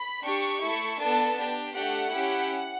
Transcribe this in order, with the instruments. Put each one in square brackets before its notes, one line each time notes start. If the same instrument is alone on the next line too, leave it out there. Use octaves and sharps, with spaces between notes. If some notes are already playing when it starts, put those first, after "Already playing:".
Already playing: [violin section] B5
D4 G4 C#6
A3 E4 A4
B3 D4 A4 A5
D4 G4
A3 D4 G4 F#5
C#4 E4 G4